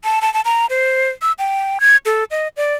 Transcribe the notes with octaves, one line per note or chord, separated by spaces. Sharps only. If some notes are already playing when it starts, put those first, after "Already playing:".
A5
A5
A5
A#5
C5
E6
G5
G#6
A4
D#5
D5